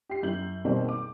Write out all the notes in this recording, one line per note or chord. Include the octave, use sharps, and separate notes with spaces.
G4 C7
F#2 E4 G6 F#7
B2 D#3 G3 G#3 A#3 C4
D6